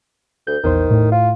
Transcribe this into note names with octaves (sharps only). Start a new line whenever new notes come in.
D2 G6
A#1 E2 D#3 C5
A2
F4